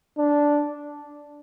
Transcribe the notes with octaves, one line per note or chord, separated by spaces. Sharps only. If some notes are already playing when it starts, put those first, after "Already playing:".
D4